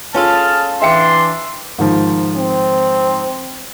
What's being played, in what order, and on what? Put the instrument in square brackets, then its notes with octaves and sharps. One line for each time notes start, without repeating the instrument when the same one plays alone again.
[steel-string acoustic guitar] C#4 F4 A4 [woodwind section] G#4 F6 [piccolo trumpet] A5
[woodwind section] E3 D4 [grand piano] E5 G5 C#7 [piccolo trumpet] C6
[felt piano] G#2 D#3 F3
[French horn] C4